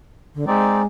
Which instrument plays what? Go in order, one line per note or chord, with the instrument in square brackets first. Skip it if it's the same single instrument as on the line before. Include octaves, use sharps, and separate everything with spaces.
[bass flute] D3
[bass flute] G#3 [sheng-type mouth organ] C4 D#4 D5